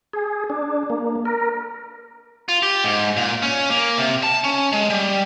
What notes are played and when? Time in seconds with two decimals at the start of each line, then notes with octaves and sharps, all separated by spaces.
0.13 G#4
0.50 D4
0.90 A#3
1.25 A#4
2.48 F4
2.63 G4
2.84 G#2
3.17 A#2
3.42 C#4
3.71 A#3
3.98 C3
4.23 A5
4.44 C#4
4.72 G#3
4.90 G3